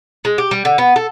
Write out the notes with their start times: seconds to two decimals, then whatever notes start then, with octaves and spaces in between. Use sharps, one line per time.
0.25 G#3
0.38 G4
0.51 G3
0.65 D3
0.78 B3
0.96 A4